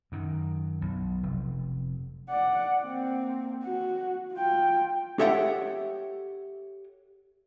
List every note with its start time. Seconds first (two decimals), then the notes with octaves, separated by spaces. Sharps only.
0.12 F#2 D#3
0.81 B1
1.23 F1
2.30 D5 F#5
2.82 A#3 C4
3.64 F#4
4.33 F4 G5
5.19 G4 A4 C#5 E5 F#5 G5